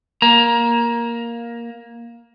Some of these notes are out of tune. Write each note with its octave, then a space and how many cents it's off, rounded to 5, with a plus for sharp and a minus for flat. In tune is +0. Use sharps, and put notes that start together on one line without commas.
A#3 +5 A#5 +20